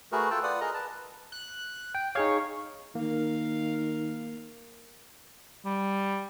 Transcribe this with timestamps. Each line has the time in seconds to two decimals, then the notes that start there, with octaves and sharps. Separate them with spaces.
0.12 A3 F#4 G#4 A#4 B4
0.31 F4 A4 G5 A5
0.43 F4 B4 D5 F#5 D#6
0.61 G#4 A#4 D#5 A#5
0.74 B4 A5
1.32 F#6
1.95 G5
2.15 D#4 G#4 C#5 F5
2.95 D#3 A#3 A#4 F5
5.65 G3